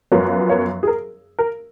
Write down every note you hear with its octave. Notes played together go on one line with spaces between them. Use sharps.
F#2 F3 B3 A#4 C#5
A#4 C#5
G#4
A#4
A#4